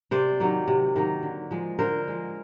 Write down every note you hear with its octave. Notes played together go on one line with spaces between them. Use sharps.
C3 C5 D5
D#3 F#3 A#3
C3
D#3 F#3 A#3
D3
F3 G#3
D3 A#4 C5
F3 G#3